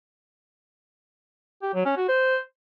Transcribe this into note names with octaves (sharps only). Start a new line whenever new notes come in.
G4
F#3
C#4
F#4
C5